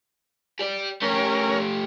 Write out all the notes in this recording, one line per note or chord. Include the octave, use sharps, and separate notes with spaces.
G4 D5
A3 C#4 G4 A#4